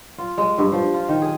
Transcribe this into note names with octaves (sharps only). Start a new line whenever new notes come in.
F4
G#3
G2
F3
F4
D#3
G#4